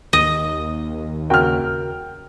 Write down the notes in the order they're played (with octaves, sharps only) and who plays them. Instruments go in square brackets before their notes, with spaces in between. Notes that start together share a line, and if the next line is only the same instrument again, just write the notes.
[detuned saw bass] D#2 [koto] D#5
[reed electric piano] C#3 F#4 A#4 [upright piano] G5 F6